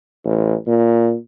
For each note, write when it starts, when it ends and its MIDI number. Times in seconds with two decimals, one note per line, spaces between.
0.25 0.54 33
0.67 1.14 46